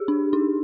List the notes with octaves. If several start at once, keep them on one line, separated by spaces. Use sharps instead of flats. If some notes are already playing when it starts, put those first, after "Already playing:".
Already playing: G4 G#4
D4
D#4